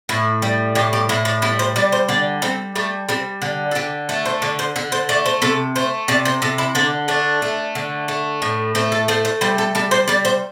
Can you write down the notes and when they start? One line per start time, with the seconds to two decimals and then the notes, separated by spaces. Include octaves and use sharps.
0.09 A2 E4
0.42 G3
0.75 A2 G4
0.93 G4
1.09 A2 E4
1.25 D4
1.42 G3 E4
1.59 C5
1.76 G3 D5
1.92 C5
2.09 D3 D5
2.42 G3 C4
2.75 G3 A3
3.09 G3 C4
3.42 D3
3.71 A4
3.75 D3 G4
4.09 A3 A4
4.26 C5
4.42 D3 D5
4.59 C5
4.76 D3 A4
4.92 C5
5.09 A3 D5
5.26 C5
5.42 C3 A4
5.76 A3 C5
6.08 C3 D5
6.25 C5
6.42 C3 A4
6.58 E4
6.75 D3 D4
7.08 A3 D4
7.42 A3
7.75 D3
8.08 A3
8.42 A2
8.75 A3 C4
8.92 A4
9.08 A3 C5
9.25 C5
9.41 G3 C5
9.58 A4
9.75 G3 A4
9.91 C5
10.08 G3 D5
10.25 C5